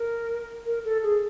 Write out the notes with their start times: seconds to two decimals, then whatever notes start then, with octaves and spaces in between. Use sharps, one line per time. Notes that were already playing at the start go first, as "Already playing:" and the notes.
Already playing: A#4
0.66 A#4
0.85 A4
1.03 G#4